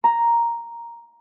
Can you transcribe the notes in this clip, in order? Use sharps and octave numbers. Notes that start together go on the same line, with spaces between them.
A#5